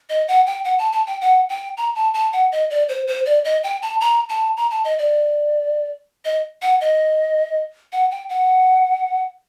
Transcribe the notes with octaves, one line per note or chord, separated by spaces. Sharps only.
D#5
F#5
G5
F#5
A5
A5
G5
F#5
G5
A#5
A5
A5
F#5
D#5
D5
C5
C5
D5
D#5
G5
A5
A#5
A5
A#5
A5
D#5
D5
D#5
F#5
D#5
F#5
G5
F#5